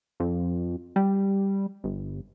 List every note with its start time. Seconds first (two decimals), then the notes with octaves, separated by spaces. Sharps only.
0.20 F2
0.96 G3
1.84 G1